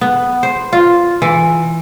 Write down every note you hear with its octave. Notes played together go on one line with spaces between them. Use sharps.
B3
C5
F4
E3